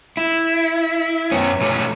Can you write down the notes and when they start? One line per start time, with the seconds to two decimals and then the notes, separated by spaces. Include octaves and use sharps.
0.17 E4
1.31 F#2 B3 C#4
1.61 B2 A3 G4 A4 C#5